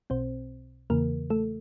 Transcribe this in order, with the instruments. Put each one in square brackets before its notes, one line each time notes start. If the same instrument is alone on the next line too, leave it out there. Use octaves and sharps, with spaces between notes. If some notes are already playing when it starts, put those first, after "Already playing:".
[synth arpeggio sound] B1 B2 C4 C5
E2 C#3 E3 A#3 A#4
A3 A4